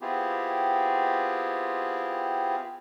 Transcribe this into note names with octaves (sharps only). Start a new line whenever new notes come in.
B3 C4 E4 F4 G4 G#4